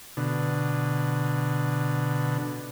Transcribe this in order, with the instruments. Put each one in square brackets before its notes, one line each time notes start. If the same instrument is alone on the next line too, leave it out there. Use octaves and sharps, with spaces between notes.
[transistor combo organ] B2 D3